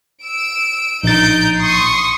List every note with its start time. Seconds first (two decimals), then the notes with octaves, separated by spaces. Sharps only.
0.23 E6 D7
1.03 A#1 D#4 G6 A6 D7
1.58 C6 C#6 D#6